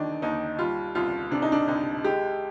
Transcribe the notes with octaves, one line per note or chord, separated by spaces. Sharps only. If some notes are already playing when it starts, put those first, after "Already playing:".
Already playing: D#2 D#3 D4 D#4
D#2 D#4
G3 F4
C2 F4
C3 D4
D#4
D4
C2 D#4
G#3 G4